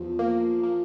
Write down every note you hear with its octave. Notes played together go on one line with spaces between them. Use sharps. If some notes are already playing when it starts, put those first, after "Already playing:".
Already playing: E2 F3
A#3
A#3